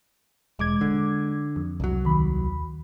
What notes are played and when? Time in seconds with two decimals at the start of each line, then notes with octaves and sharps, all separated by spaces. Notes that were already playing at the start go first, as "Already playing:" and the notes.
0.59 E1 G#3 D6 G#6
0.81 D3
1.56 F2
1.80 C2 F#3
2.05 D#2 B5